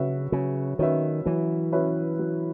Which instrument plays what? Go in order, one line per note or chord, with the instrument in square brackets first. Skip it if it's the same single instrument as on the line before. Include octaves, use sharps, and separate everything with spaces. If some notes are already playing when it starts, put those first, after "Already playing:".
Already playing: [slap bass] C#3 [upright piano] F#3 C#4 F#4 B4 E5
[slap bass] C#3 [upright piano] F#3
[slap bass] D#3 [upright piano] C#4 F#4 B4 E5
[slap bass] E3 [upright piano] F#3
[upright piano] C#4 F#4 B4 E5
F#3